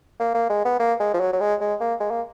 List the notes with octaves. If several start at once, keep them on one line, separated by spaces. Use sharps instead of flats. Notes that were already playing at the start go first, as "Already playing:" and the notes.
A#3
A#3
G#3
B3
A#3
G#3
F3
F#3
F#3
G#3
G#3
A#3
G#3
A#3